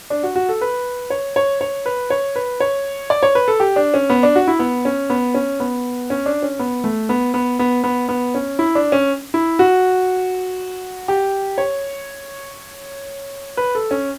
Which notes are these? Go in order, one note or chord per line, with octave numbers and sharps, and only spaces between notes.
D4
F#4
F#4
A4
B4
C#5
C#5
C#5
B4
C#5
B4
C#5
D5
C#5
B4
A4
G4
D4
C#4
B3
D4
F#4
E4
B3
C#4
B3
C#4
B3
C#4
D4
C#4
B3
A3
B3
B3
B3
B3
B3
C#4
E4
D4
C#4
E4
F#4
G4
C#5
B4
A4
C#4